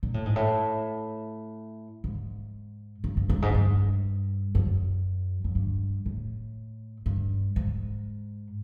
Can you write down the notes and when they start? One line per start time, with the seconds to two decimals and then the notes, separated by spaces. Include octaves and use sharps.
0.03 A#2
0.14 A2
0.26 G#2
0.36 A2
2.04 G#2
3.04 G2
3.17 G2
3.29 G2
3.42 G#2
3.49 F#2
3.54 G2
4.55 F#2
5.44 F#2
5.55 G2
6.06 A2
7.06 G2
7.56 G#2